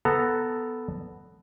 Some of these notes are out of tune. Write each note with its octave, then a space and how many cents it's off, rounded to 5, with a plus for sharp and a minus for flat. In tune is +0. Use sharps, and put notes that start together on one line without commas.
B3 +0 A4 +0 A#5 -15